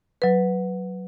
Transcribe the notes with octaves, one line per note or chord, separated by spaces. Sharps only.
F#3 B4